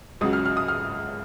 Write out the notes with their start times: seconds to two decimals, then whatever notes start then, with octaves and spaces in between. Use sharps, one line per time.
0.21 C#2 C#3 F#3 D#6
0.33 F6
0.45 F6
0.57 D#6
0.68 F6